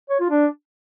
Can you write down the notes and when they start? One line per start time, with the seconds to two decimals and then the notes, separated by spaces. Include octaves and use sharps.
0.10 C#5
0.20 F4
0.30 D4